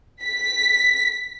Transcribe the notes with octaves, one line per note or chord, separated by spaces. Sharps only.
B6